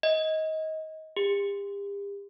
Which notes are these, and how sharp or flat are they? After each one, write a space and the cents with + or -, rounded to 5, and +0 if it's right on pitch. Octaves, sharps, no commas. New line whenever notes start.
D#5 +25
G4 +40